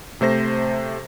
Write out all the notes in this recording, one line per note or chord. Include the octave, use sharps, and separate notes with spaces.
C3 A3 C5 A#6